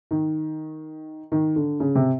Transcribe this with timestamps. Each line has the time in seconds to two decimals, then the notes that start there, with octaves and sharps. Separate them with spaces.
0.11 D#3
1.32 D#3
1.56 D3
1.80 C#3
1.95 C3